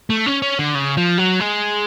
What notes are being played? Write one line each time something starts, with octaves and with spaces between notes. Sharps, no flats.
A3
C#4
C#4
D3
C#3
F3
F#3
G#3